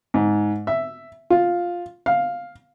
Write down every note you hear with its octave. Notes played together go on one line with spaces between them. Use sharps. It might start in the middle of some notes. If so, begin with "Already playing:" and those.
G#2
E5
F4
F5